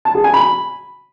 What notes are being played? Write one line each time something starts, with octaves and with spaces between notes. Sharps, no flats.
A5
G#4
G#5
B5